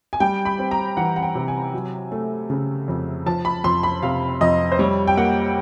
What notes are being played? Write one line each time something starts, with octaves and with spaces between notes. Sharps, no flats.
G#5
G3 G5
B5
C4
A#5
E3 F#5
F#5
G5
C3
G#5
F#3
A3
C#3
F2
F3 A5
B5
F2 C6
B5
C3 F5
F2 D#5
C5
G3 C#5
G5
A#3 F#5